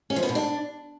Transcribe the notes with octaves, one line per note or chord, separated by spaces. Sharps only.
C#4
F3
B3
B2
D4